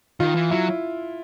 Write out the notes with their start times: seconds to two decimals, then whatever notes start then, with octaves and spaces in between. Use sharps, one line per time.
0.20 D#3 F4
0.35 E3
0.51 F#3 E4